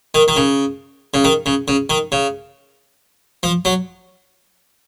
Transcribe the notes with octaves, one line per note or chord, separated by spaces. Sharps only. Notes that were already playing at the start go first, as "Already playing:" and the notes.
D#3
D#3
C#3
C#3
D#3
C#3
C#3
D#3
C#3
F3
F#3